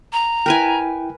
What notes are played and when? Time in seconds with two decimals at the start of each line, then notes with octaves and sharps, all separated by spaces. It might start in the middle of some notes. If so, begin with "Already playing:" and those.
0.13 A#5
0.46 E4 A#4 B4 G5 G#5